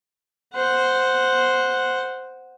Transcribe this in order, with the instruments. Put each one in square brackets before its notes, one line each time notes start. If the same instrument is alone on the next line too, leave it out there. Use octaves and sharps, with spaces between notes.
[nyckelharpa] C5 F#5